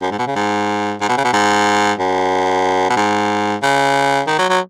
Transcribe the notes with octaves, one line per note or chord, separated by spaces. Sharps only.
F#2
G#2
B2
C#3
G#2
G#2
B2
C#3
B2
G#2
F#2
B2
G#2
C#3
D#3
F#3
F#3